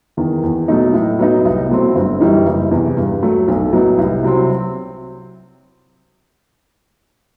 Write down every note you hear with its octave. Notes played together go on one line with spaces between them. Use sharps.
E2 D#3
E2
B2 F#3 A3 D#4
A2
F#3 B3 D#4
C2
B2 F#3 A3 C4
G1
F#2 E3 G3 D#4
F#1
E2 C3 E3
G2
F#3 A3
B1
A2 F#3 B3 D#4
C2
C3 F#3 C4